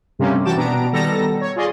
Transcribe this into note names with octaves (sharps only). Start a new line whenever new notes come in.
G2 C3 G3 A3 A#3 C#4
E3 F#4 G5 A5 D6 E7
B2 B3 D4 A#5 D7
D#3 G3 B3 A4 A#5 A#6
C#5
F4 G#4 D5 D#5 C6